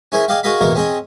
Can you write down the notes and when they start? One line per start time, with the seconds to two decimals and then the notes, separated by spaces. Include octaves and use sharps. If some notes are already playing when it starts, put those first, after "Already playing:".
0.12 C#4 E4 G#4 A#4 C5
0.28 G#4 D5 D#5 F5 G5
0.43 F#4 G#4 A#4 D#5 F5 B5
0.61 A1 E2 B2 G#3 A#3 A#4
0.75 C4 C#4 G#4 D#5 G5